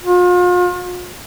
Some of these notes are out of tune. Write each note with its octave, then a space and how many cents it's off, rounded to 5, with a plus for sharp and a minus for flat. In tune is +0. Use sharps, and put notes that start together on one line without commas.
F4 +40